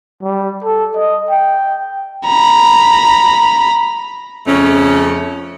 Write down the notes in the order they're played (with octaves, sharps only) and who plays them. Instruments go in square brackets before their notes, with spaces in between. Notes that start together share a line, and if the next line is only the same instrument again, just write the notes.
[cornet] G3
A4
D#5
G5
[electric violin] A#5 B5
[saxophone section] F2 C#3 A3 C#4